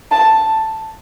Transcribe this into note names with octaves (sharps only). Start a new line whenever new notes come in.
A5